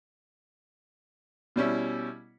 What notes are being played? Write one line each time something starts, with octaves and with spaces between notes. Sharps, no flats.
B2 G3 C#4 E4